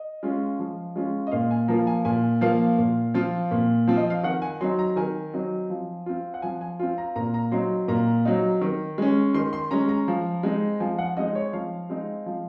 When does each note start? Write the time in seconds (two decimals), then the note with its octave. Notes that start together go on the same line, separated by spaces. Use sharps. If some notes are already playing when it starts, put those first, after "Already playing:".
Already playing: D#5
0.23 G#3 C#4 F4
0.59 F3
0.96 G#3 C#4 F4
1.27 D#5
1.32 A#2 F5
1.51 G#5
1.68 F3 A#3 F4 A#5
1.87 G#5
2.05 A#2 G#5
2.41 F3 A#3 F4 F5
2.78 A#2
3.14 F3 C4 F4
3.51 A#2
3.87 F3 C4 F4
3.97 D#5
4.10 F5
4.23 D#3 F#5
4.42 G#5
4.61 F#3 C4 D#4 C6
4.79 A#5
4.96 D#3 G#5
5.33 F#3 C4 D#4
5.70 F3
6.06 C4 F4
6.34 F#5
6.42 F3 G#5
6.61 G#5
6.79 C4 F4
6.98 A#5
7.16 A#2 A#5
7.34 A#5
7.51 F#3 C4 D#4 C6
7.88 A#2 A#5
8.25 F#3 C4 D#4
8.61 D#3
8.98 G#3 C#4
9.34 D#3 C6
9.53 C6
9.71 G#3 C#4 A#5
9.89 A#5
10.08 F3
10.43 G#3 C4 D#4
10.80 F3 G#5
10.98 F#5
11.17 G#3 C4 D#4 D#5
11.35 C#5
11.53 F3 F5
11.90 G#3 C4 D#4
12.26 F3